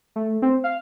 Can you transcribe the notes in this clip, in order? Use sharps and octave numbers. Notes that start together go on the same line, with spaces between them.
A3
C4
F5